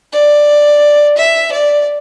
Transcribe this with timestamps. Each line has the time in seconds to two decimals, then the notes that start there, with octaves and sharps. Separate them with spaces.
0.12 D5
1.17 E5
1.52 D5